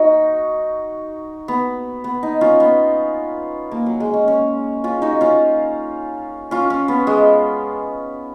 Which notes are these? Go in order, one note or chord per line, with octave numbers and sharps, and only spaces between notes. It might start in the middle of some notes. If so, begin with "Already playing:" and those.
Already playing: D#4 F#4
B3
B3
D#4
C#4 F4
B3
A#3
F#3
G#3
C#4
C#4
C#4 F4
D#4 F#4
C#4 F4
C#4 F4
C#4
B3
G#3